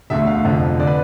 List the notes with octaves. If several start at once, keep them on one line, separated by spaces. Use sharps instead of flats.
E1 D2 D3 A3 E5
F5
F1 F2 D3 F3
D3 D5
B4